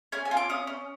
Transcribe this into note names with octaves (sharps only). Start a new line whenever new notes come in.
C#4 G#5
G#5
F4
D6
C#4 D#6
C#4